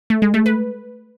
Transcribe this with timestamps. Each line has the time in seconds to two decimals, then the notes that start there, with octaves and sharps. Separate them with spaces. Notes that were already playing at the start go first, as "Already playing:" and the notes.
0.10 A3
0.22 G#3
0.34 A3
0.46 B4